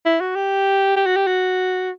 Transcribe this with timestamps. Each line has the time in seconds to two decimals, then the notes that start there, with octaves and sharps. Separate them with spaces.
0.05 E4
0.20 F#4
0.36 G4
0.96 G4
1.06 F#4
1.16 G4
1.27 F#4